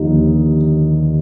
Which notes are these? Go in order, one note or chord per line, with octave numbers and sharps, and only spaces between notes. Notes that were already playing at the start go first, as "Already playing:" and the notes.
Already playing: D#2 D3 F3 D#4